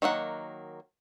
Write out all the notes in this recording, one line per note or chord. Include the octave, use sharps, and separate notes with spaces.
D#3 F#3 A#3 F#5